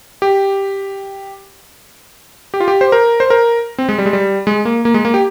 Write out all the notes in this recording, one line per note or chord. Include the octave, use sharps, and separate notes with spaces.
G4
G4
F4
G4
C5
A#4
C5
A#4
C4
G#3
G3
G#3
G3
G#3
A#3
A#3
G#3
A#3
G4